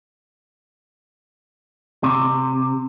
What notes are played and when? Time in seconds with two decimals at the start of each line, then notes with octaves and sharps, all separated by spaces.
2.03 C3